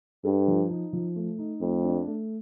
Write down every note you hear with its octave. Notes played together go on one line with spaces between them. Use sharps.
G2 A4
F3
D#4
F3
A3
D#4
F2 A3
D4
A3